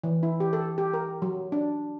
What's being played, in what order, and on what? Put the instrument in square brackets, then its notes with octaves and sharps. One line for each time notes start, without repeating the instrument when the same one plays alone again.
[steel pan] E3
E4
G4
A4
G4
A#4
F#3
D4